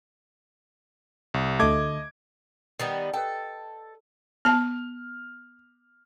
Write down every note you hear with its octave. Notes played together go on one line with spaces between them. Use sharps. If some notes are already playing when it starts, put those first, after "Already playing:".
C2
D2 A3 D#5 D6 G#6
D#3 G3 B3
A4 B4 D#5 G5
B3 A5 F6